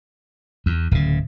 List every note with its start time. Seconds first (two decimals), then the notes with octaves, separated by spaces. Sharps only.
0.66 E2
0.91 D1 C#3